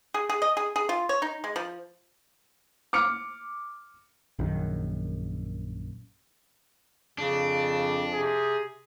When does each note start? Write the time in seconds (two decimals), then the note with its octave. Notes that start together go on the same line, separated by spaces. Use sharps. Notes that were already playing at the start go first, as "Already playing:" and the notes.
0.14 G#4
0.29 G#4
0.42 D#5
0.57 G#4
0.76 G#4
0.89 F4
1.09 C#5
1.22 D#4
1.44 G#3
1.56 F3
2.93 D6 F6 C#7
4.39 A#1 F#2 D#3
7.18 F2 C#3 D4
8.13 C3 G#4